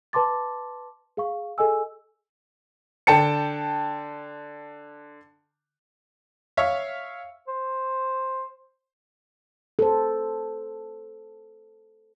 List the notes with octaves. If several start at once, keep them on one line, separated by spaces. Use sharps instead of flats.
B4 A5 C6 D6 A6
G#4 F5 C#6
G#4 A4 D#5 G#5 E6
D3 G5 A5 C#7
C#5 E5 F5
C5
A4 C5